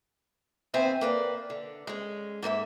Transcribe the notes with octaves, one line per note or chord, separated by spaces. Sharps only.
D#2 B3 C4 C5 E5 G#5
A#3 B4 D5
D3
G#3 C#4
G#2 A#3 B4 E5